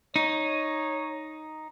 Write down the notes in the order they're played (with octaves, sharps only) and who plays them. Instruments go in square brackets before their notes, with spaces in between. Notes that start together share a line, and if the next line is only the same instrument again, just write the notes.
[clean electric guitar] D#4 [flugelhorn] C#5